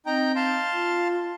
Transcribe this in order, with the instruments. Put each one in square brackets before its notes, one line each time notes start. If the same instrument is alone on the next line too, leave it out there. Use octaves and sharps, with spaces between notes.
[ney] C4 [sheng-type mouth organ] D#4 G5 A#5
[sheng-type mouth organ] F5 A5 C6
[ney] F4